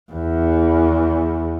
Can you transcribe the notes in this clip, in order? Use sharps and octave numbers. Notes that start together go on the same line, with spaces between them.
E2